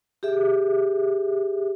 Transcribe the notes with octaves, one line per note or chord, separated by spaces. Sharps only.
G4 G#4 E5